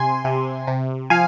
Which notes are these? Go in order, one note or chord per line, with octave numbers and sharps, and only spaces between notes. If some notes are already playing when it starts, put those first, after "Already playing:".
Already playing: C3 G#5 C6
C3
C3
F3 F5 G#5